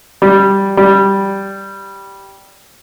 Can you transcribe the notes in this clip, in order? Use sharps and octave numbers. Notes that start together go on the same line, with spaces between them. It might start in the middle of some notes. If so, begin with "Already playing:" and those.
G3
G3